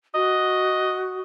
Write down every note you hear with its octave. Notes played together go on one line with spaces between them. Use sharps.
F#4 D#5